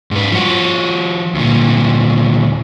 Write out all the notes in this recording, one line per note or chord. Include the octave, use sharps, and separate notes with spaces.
G#2 B4
F3 F#4
D2 A#2